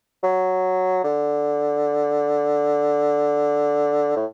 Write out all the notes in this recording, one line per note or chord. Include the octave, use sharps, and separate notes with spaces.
F#3
D3
A2